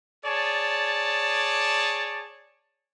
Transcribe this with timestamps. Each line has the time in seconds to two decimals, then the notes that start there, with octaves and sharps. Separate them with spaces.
0.26 G#4 C#5 D5 A5